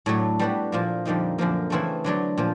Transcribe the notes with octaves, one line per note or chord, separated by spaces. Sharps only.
A2 F#3 A3 D4
G3 B3 D4 F#4 B4
A#2 F3 A#3
F2 D3 G3 A#3 D#4
F#2 D3 F3 A#3
C#3 E3 A3 C4 E4
D3 F#3 A3 D4
A#2 F3